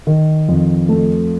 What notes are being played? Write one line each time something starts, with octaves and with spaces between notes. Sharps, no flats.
D#3
F2
A3